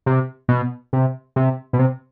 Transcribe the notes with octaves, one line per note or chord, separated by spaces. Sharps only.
C3
B2
C3
C3
B2
C3